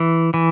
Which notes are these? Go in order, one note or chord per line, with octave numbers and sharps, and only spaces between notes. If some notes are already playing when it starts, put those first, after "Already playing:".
Already playing: E3
E3